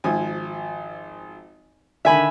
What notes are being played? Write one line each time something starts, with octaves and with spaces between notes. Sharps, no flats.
G#1 F3 G#5
D3 D#3 E5 G#5 B5